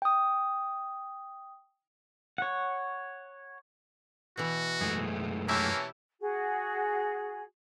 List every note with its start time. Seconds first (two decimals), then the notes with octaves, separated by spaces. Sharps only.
0.02 G5 D#6
2.38 C#5 F#5
4.37 B2 E3 F#4
4.81 F#2 G#3 A3 G#4
5.48 E3 A#3 C#4 E4 G4 E5 A5
6.20 F#4 G#4